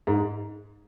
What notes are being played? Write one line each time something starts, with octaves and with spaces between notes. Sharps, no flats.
G#2